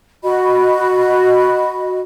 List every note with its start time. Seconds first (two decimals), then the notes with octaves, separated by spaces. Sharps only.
0.23 F#4 D#5 B5